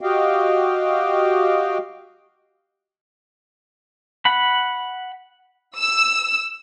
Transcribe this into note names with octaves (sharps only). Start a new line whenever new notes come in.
F#4 G4 D#5 F5 G5
F#5 B5
E6